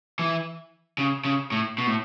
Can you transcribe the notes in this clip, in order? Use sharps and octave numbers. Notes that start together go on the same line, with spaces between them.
E3
C#3
C#3
A2
B2
A2